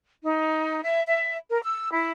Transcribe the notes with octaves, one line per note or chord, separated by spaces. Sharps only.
D#4
E5
E5
A#4
E6
E4